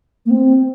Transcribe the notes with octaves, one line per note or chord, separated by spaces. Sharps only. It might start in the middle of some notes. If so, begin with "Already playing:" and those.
A#3
C4